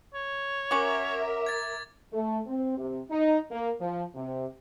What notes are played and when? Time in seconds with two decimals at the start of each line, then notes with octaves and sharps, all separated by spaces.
0.14 C#5
0.71 C#4 F#4 A#4 E5 D6
1.46 G#6 A6
2.13 A3
2.47 C4
2.78 C3
3.11 D#4
3.51 A#3
3.81 F3
4.15 C3